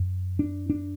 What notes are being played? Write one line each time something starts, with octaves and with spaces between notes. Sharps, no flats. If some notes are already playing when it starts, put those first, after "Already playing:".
Already playing: F#2
D4
D4